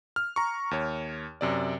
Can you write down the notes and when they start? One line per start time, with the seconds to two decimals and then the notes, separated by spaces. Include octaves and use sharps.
0.16 F6
0.36 A#5 C#6
0.71 D#2 C#5
1.41 F#2 C3 D5